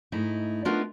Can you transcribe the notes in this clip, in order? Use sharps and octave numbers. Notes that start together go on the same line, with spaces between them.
G#2 A3 D#4 E4
A3 B3 D4 D#4 F4 A#4